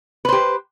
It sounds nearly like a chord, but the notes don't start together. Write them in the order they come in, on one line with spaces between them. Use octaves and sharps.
B4 C5 G4